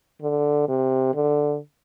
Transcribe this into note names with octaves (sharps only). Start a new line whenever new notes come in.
D3
C3
D3